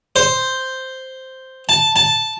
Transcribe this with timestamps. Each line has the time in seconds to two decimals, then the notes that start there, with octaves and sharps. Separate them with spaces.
0.16 C5
1.69 A5
1.96 A5